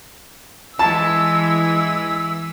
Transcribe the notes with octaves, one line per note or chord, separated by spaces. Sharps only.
E3 G#3 A5 E6